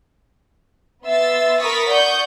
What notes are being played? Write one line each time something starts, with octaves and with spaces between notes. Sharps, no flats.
B3 E5 C6 E6 A6
A#4 B5 C#6 D#6 A6 B6
D5 F#5 C#6 D#6 G6